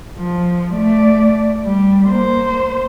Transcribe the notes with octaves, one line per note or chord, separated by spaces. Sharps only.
F3
A3 D5
G3
A#3 C5